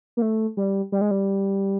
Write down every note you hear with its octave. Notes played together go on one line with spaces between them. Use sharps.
A#3
A3
G3
G3
G#3
G3